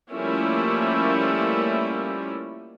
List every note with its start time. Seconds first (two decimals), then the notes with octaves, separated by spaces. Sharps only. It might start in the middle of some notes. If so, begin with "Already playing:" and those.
0.12 F3 G3 A3 A#3 C#4 E4